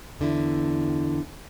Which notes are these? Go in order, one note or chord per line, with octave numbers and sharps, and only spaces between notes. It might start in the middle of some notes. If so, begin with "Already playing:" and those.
E2 D3 E4